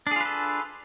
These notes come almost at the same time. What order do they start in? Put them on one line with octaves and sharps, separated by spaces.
D4 G#4 F4 B4 A4